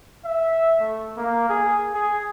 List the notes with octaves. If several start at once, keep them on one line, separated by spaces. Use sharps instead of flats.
E5
A3
A#3
G#4
G#4